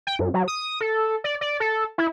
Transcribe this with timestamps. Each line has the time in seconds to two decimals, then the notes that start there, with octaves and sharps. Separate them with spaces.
0.07 G5
0.19 F#2
0.34 F#3
0.48 D#6
0.81 A4
1.24 D5
1.41 D5
1.60 A4
1.98 E4